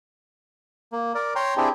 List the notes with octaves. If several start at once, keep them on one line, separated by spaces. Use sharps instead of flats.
A#3
A#4 D5
C#5 G5 A#5 C6
C4 D4 E4 G4 G#4